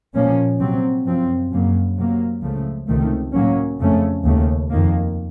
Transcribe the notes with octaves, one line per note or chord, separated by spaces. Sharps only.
A#2 F3 A#3 C#4
C3 F#3 C4
F#2 F3 C4
F#2 C#3 F#3 A#3
C3 F#3 A#3
C#2 C#3 F3 A3
C#2 C3 D#3 A3
A2 F#3 A#3 C#4
F2 C#3 A3 C#4
D#2 C#3 A3
F2 D#3 A#3